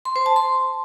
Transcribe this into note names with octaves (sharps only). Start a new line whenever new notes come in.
C6
C5
A5
C6